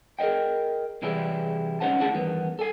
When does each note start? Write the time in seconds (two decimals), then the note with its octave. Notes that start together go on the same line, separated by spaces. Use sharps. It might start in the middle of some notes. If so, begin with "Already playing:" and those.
0.19 G#4 A#4 B4 D#5 G5
1.02 C3 E3 G3 E4 G#4
1.80 C2 C#4 D#4 C5 F#5 A5
1.99 D2 D4 E4 G#4 F#5 A5
2.14 E2 G2 D#3 B3
2.59 A4 G#5